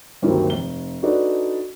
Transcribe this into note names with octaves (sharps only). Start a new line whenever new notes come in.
D2 G2 D#3 F#3 A#3 C4
F1 G7
D4 D#4 F#4 A4 B4 D5